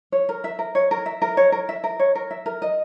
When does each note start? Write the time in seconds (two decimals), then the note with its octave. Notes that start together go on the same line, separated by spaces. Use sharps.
0.12 C#5
0.29 A#4
0.44 E5
0.59 A#4
0.75 C#5
0.91 A#4
1.06 E5
1.22 A#4
1.37 C#5
1.52 A#4
1.69 E5
1.84 A#4
1.99 C#5
2.15 A#4
2.31 E5
2.46 A#4
2.62 D#5